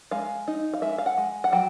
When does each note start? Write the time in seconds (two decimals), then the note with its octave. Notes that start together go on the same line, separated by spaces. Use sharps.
0.11 G#3 F5
0.48 D#4
0.74 F5
0.82 G#3 E5
0.98 F5
1.06 F#5
1.18 G#3
1.44 F#5
1.52 F#3 G5